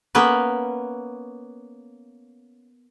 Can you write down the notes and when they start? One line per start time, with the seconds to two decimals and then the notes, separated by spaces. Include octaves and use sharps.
0.15 A#3 B3 C#4 B4